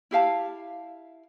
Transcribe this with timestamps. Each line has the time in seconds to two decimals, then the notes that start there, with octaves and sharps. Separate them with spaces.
0.11 E4 G4 F5 A5